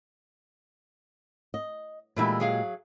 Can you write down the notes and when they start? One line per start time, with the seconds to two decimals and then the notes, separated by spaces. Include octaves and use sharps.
1.54 D#5
2.16 A#2 E3 G#3 A3 E4 G4
2.40 F#3 G#4 F5